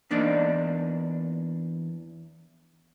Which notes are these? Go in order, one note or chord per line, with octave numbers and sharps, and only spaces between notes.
E2 A#3 D4 D#4 D5 A5